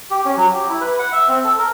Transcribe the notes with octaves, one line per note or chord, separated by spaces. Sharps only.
G4
C#4
F#3
G4
E4
B4
F#5
E5
C4
A4
A#4